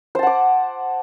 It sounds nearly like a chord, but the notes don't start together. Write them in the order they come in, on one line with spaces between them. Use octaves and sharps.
C5 A5 F#5 D6